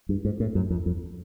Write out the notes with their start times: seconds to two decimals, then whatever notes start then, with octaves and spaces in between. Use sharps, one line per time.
0.09 G2
0.25 G#2
0.40 A2
0.55 F#2
0.70 F2
0.86 F2